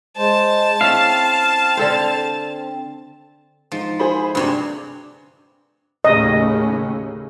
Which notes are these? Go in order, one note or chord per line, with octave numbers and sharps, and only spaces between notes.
G#3 C5 A5
C4 C#4 E4 F5
D3 A4 C5
G#2 F3
G#4 C5 B5
D2 G2 C3 C#5
D#2 A2 C#3 D#5